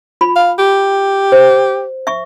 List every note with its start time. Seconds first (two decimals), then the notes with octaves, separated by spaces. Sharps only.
0.21 F4 B5
0.36 F5
0.59 G4
1.32 C5
2.07 E5 C#6